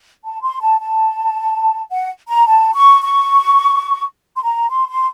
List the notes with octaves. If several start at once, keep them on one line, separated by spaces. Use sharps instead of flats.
A5
C6
A5
A5
F#5
A#5
A5
C#6
C#6
C6
A#5
C6
C6